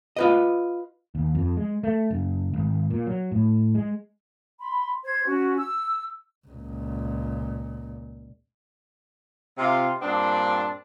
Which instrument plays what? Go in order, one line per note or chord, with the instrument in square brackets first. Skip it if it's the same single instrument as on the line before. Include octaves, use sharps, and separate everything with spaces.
[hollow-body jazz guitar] F4 B4 D#5
[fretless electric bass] D#2
F2
G#3
A3
F#1
G#1
A#2
F#3
A2
G#3
[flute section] B5 C6
C5 G#6
C#4 F#4
E6
[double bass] C#2 A#2
[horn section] C3 F4 F5
G2 A#2 C4 D4